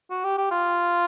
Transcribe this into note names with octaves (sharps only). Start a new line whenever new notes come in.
F#4
G4
G4
F4